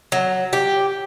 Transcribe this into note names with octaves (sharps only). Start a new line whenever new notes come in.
F#3
G4